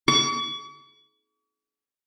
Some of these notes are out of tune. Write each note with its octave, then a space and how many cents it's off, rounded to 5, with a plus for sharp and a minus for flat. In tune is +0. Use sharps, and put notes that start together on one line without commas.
C#6 +45